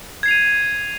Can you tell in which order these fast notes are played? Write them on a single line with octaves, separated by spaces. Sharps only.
G#6 C7 F7 D#7